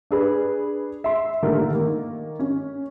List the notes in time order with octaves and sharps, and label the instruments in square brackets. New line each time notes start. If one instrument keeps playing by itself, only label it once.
[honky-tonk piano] D4 G#4 B4
E5 C6
A#2 D3 D#3 G3 A3 A#4
D#3 A#3
C#4